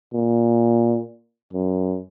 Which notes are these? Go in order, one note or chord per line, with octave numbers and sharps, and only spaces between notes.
A#2
F#2